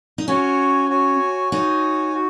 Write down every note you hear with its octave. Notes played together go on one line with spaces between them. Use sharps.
D#4
C#4 F#4 C#5 G#5
F#4 C#5 G#5
D#4 F#4 C#5 G#5
F#4